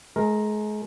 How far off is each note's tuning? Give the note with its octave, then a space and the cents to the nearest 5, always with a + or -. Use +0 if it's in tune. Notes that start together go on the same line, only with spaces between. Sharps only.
G#3 +35 A#4 +0